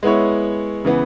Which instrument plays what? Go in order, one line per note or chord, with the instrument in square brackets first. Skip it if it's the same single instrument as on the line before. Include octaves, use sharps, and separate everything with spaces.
[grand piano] G#3 B3 E4 C#5
C#3 E3 B3